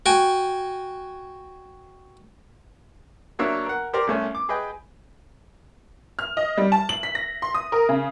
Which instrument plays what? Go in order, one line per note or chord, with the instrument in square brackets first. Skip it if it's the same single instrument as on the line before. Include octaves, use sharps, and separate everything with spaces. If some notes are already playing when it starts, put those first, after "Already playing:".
[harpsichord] F#4 G5 G#5
[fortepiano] F#3 A#3 D4 C#5 E5
A#4 F#5
G4 A#4 C5 D5 A#5
C2 A3 C#4
D6
G#4 B4 D#5 G5
[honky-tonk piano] F6
D#5
G3
A5
F#7
B6
A#6
C6
D#6
A#4
C#3